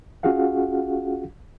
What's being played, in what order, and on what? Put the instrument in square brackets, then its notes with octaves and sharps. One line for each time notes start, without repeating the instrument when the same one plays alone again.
[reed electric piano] C#4 F4 F#4 G#4 F5 F#5